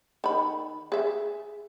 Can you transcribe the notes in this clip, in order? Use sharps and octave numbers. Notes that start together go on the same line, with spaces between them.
D#3 B5
G#4 E5